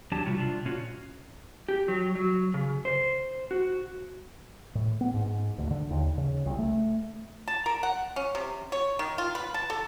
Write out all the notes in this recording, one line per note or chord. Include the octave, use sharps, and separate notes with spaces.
E2 F#3 D4 G4 G5 A5
C3 G3 F4 F#4
C3 D4 F4
A#2 C#4 F4 F#4
G4
F#3
F#3
C#3
C5
F#4
A2
B3
G#2
D2
D3
D#2
C#3
C2
A3
A5
A#4
F#5
C#4
C3
C#5
D#3
F4
B4
A5
A4